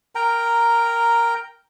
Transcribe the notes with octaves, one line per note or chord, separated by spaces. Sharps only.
A#4 G5 A#5